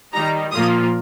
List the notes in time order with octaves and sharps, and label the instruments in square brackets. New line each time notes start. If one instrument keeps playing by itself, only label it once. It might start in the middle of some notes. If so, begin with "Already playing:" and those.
[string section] D#3 G3 D#4 A#5
A#2 F3 A#3 F4 D#6